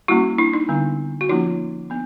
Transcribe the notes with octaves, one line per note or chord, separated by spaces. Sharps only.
G3 A#3 C#4 E4 F#4
D4 E4
D#4
D3 G3 B3 D4
F#4
F3 A#3 C#4 D#4 F4
B3 D4